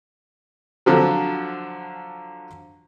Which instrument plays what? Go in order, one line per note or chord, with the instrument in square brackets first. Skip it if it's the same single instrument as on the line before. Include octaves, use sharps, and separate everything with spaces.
[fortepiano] D3 F3 F#3